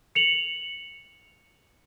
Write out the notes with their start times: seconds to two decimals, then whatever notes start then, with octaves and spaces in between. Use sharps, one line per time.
0.15 C#7 F7 F#7